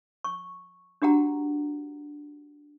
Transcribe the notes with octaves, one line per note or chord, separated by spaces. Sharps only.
C#6
D4 F#4 G4 F#5 A#5